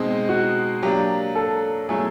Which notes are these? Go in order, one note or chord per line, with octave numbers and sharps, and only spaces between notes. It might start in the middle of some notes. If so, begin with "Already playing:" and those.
Already playing: B2 G#3 C4 D#4
F#4
F#3 A#3 D4 G4
A4
B2 F#3 A3 C#4 E4 G#4